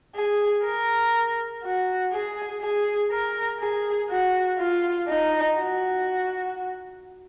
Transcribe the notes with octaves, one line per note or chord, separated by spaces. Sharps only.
G#4
A#4
F#4
G#4
G#4
A#4
G#4
F#4
F4
D#4
F#4